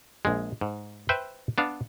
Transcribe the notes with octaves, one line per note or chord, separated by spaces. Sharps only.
A#1 G#3
G#2
B4 C5 E5 G5
B3 D4 F5